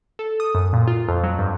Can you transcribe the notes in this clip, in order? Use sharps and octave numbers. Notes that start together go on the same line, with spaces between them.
A4
D#6
F#2
A#2
F4
F2
F#3
G2